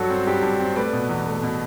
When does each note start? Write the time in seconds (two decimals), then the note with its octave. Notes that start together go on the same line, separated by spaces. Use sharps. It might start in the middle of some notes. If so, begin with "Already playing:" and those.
Already playing: G2 F#3 F#4 A4
0.10 C4
0.27 G2 G4
0.43 G2
0.60 C4
0.76 A3 B4 D5
0.93 B2
1.09 E2
1.26 A3
1.43 B2